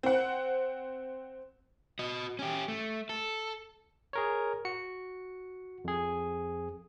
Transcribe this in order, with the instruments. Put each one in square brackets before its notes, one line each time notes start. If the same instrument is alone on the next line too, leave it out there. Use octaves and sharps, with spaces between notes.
[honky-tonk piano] C4 F#5
[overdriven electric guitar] F#4 D#5
C#4 G4
A3
A4
[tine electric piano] G#4 A#4 C#5
F#4 C#7
F2 G#4